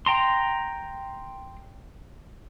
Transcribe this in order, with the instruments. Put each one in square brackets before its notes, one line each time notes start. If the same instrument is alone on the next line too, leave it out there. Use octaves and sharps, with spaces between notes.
[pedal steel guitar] G5 A#5 C6